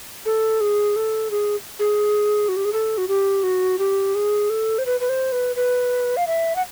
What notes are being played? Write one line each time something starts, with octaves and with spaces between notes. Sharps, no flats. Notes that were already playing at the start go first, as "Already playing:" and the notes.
A4
G#4
A4
G#4
G#4
F#4
G4
G#4
A4
F#4
G4
F#4
G4
G#4
A4
C5
B4
B4
C5
B4
B4
F5
E5
F#5